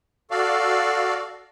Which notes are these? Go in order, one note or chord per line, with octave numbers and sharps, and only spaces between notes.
F#4 A4 D5 F5